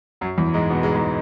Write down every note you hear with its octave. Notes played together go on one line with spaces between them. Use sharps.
F#2 F#3
E2 E3
G#2 G#3
B2 B3
G#2 G#3
G#2 G#3